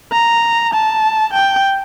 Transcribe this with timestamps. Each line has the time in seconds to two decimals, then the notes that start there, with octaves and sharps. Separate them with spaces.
0.12 A#5
0.74 A5
1.33 G5